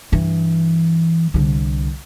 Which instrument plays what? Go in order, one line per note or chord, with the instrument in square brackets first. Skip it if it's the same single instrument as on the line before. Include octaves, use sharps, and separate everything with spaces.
[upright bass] G2 E3
C2 D3